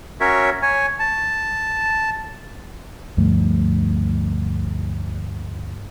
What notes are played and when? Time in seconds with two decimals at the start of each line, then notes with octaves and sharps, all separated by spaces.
0.20 C#4 F#4 A#4 C#5 E5
0.62 C#5 G#5
0.99 A5
3.17 D2 G2 F3 A3